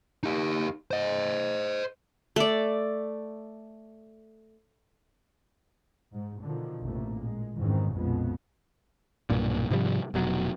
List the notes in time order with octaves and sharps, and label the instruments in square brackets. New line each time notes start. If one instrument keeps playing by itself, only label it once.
[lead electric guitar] D#4 G4
C5 D#5
[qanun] A3 D5
[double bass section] G#2
B2 D3 D#3 F3
A1 F2 C3 A3 A#3
A#2 G#3
F2 G#2 D#3 E3 C4 C#4
A#1 F2 B2 G#3 B3
[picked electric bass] B1 G2 A#2
G#2 C3 F3 G3
F1 B2 F#3